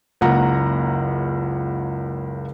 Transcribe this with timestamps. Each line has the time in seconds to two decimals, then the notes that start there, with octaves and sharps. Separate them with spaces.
0.21 F#1 C#2 A#3 F#5 A#5